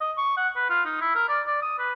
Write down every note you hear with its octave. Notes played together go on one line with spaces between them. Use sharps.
D#5
C#6
F#5
B4
F4
D#4
E4
A#4
D5
D5
D#6
B4